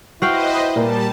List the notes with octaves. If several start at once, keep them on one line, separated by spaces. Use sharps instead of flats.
E4 F#4 B4 C5 D#5 F5 G5
A#2 G3 A#4 A5